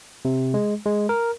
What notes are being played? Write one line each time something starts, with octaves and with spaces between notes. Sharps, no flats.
C3
G#3
G#3
A#4